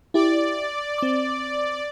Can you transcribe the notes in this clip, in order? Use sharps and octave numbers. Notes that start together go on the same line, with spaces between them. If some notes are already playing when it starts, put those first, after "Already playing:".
E4 G4 D5
C4 D6